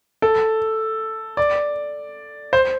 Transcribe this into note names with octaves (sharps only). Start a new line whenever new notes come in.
A4
D5
C5